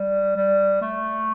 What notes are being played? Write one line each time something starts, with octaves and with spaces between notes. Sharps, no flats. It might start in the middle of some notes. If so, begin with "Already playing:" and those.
Already playing: G3
G3
A3